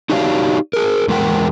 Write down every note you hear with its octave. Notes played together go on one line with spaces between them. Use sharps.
D#4 F#4 G4 C#5 D5 F5
G#4 A#4
E2 G#3 A#4 F#5 G5